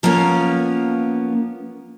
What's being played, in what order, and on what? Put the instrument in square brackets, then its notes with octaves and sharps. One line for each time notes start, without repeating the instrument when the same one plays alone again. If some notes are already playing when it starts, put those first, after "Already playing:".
[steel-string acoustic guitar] F3 A#3 B3 C#4